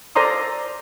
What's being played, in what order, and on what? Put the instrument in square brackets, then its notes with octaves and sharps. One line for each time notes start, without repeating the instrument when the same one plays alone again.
[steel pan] A4 C5 D5 A#5 C6 D#6